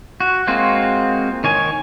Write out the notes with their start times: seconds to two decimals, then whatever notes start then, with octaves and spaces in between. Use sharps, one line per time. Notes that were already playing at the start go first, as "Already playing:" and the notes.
0.20 F#4
0.47 G#3 A#3 C4 F4 F#4
1.44 D#3 C#5 G#5